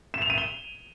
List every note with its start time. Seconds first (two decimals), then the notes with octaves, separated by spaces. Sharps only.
0.14 E7
0.22 F7
0.30 D#7
0.38 G7